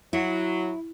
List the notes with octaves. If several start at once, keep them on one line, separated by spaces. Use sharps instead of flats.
F#3 E4